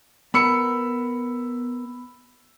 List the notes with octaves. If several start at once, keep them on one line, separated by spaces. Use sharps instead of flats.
B3 A#4 B5 E6 C#7